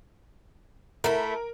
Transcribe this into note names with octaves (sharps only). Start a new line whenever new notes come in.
A3 E4 A#4